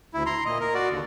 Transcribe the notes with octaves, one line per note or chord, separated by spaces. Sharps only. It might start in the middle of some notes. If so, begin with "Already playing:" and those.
D2 E4
A#5 C6
A#2 D#5
A#4
F#4 D5
D#2 D3